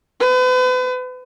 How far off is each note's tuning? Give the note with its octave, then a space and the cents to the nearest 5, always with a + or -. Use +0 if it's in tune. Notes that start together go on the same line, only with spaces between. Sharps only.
B4 +40